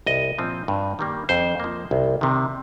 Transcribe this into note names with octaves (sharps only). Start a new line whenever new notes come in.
C2 D#5
A#2 F3 C4
G2
D#3 G3 A#3
F2 C5
F3 A#3
C2
C3 D#3